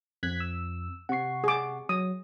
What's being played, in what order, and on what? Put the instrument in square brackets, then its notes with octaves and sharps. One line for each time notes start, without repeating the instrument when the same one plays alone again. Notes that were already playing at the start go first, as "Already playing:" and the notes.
[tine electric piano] F2 [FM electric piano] F#6 G#6 B6
[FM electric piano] E6
[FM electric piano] C3 C#6 [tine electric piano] F#5 C7
[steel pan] G#4 D6
[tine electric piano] F#3 [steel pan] D#6